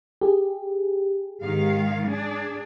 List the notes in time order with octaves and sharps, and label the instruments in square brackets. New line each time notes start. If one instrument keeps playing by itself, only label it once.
[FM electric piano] G4 G#4
[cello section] G#2 D#3 F5
D4 G#4